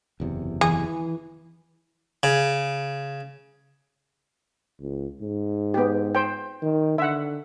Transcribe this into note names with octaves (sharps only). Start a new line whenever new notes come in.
F#1 E2 C3
E3 G#4
C#3
C#2
G#2
B3 G4
C5 G5
D#3
D3 E5 F#5